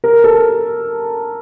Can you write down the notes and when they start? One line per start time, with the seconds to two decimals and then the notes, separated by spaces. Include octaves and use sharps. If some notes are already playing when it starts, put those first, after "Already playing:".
0.04 A#4
0.24 A4